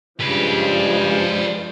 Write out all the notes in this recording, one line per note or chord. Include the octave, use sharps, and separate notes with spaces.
G2 C#3 F3 G#3 B4 D5